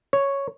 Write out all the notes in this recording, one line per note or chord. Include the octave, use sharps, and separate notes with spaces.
C#5